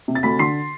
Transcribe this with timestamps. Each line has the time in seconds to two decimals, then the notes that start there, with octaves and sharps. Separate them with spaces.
0.08 C3
0.15 A6
0.23 D2 B5 B6
0.39 D3 C6 C7